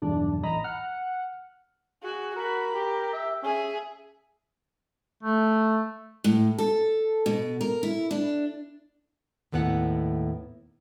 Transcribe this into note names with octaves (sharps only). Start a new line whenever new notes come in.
B1 E2 G2 D4
A1 D#5 A#5 B5
F#5 F6
F#4 G#4
F#4 A#4 B5
G4
E5
C#4 G#4 E5
A3
A2
A4
B2
A#4
E4
D4
D#2 A2 B3 E4 F#5